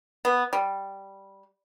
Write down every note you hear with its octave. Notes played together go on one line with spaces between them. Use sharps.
B3
G3